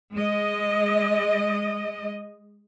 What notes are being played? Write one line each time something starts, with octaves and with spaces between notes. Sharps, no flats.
G#3 D#5